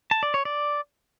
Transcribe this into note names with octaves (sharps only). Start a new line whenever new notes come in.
A5
D5
C#5
D5